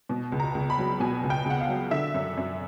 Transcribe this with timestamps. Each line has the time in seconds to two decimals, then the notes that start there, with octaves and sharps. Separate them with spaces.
0.09 B2
0.32 C#2
0.40 A#5
0.55 C#2
0.70 B5
0.78 F#3
1.00 B2 G#5
1.23 C#2
1.30 G5
1.45 C#2 F#5
1.61 F5
1.68 F#3
1.91 D3 E5
2.14 F#2
2.37 F#2